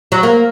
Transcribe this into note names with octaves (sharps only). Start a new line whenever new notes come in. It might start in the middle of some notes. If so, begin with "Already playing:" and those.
F#3
A#3